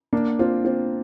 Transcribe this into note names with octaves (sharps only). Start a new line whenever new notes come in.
A#3 D4
C4 F4
C4 F4